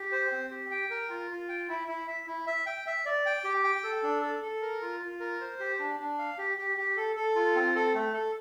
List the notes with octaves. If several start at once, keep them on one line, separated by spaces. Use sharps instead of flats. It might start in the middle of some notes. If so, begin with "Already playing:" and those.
Already playing: G4
C5
C4
G4
G5
A#4
F4
F4
G5
E4
E4
E5
E4
E5
G5
E5
D5
G5
G4
G5
A4
D4
A4
A4
A#4
F4
F4
A#4
C5
G4
D4
D4
F5
G4
G4
G4
A4
A4
F4
C4
A4
A3
A4